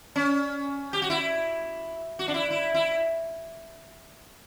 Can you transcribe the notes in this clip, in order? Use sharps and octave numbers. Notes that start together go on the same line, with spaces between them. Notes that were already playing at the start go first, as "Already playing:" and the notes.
C#4
G4
F#4
E4
F#4
D4
E4
E4
E4